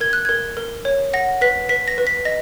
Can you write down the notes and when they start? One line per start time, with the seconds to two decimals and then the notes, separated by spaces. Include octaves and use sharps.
0.01 A#4 G#6
0.13 F#6
0.25 A#4 G#6
0.57 A#4
0.85 C#5
1.14 F#5 A#6
1.41 B4 B6
1.69 B4 B6
1.88 A#6
1.98 B4
2.07 B6
2.25 D#5 A#6